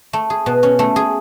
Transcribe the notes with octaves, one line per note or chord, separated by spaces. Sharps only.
A3
G#4
B2
C#4
A3
G#4